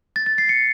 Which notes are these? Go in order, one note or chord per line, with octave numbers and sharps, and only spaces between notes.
A6
A6
C7
C#7